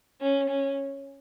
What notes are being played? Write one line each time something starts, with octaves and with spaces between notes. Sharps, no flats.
C#4
C#4